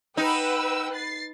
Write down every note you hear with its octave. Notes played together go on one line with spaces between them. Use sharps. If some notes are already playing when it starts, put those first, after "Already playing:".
D#4 B4 F#5 G5 E6
A6 C7